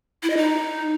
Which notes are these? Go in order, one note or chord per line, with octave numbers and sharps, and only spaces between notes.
E4
D#5
D#4